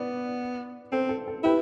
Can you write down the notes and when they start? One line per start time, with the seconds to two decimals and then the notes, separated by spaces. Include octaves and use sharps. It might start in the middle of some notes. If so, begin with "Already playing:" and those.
Already playing: B3 B4 D5
0.92 C4 A4 C5
1.09 A4
1.28 A4
1.44 E4 G4 B4